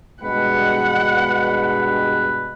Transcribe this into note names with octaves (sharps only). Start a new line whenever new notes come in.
G2 B2 G#3 B4 F#5